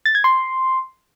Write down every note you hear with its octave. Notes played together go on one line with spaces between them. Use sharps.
A6
G#6
C6